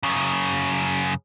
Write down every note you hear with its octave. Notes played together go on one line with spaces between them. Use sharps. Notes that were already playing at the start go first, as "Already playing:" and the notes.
F#2 C#3